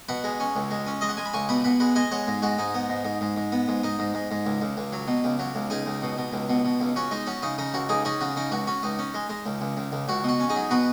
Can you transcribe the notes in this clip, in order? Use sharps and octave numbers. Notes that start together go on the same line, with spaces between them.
B2 F#5 B5
G#3
C#4
C#2
G#3
C#4
G#3 D#5
F#5
G#3 G#5
B5
C#2 G#5 C#6
B2 F#5 B5
B2 F#5 B5
G#3 F#5 B5
G#3 D#5 G#5
G#3 C#5 F#5
G#2
G#3 F#4
G#2 D#4
B3
G#2
G#2
G#2
G#2
B3
G#2
G#2 D#4
G#2
G#2
G#2
C#2
C#2
C#2
F#3
B2
C#2
F#3
C#2
C#2 D#4 G#4
C#2
B2
B2
C#2
B2
B2
C#2
C#4 F#4
G#3 D#4
C#4 F#4
C#3 D#4
C#3 D#4
C#2 F#4
C#2 D#4 G#4
C#4 D#4 G#4
C#3 F#4
C#3 D#4
C#2 F#4
C#4 F#4
C#2 D#4
C#4
G#3
G#3
C#2
C#2
C#2
C#2
C#2 F#4
B2 F#4
C#4
D#4 G#4
F#3
B2 F#4 B4